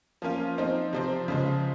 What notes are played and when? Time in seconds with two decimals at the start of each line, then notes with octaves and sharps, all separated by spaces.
0.22 F3 A#3 C#4 F4
0.58 F3 C4 D#4
0.93 C3 F3 C4
1.28 C#3 F3 G#3